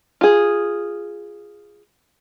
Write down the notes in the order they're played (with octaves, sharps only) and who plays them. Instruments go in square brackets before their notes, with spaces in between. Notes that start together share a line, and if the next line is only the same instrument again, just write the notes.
[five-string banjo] F4 G#4